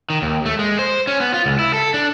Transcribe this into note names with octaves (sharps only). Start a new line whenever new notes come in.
D#3
D#2
A3
G#3
C5
C#4
B3
F4
C#2
E4
A4
D4